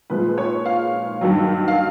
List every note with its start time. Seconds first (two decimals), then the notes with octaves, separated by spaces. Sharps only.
0.10 A#2 F3 G#3 B4
0.38 C#5
0.66 F5
1.21 G2 D#3 F#3
1.68 F5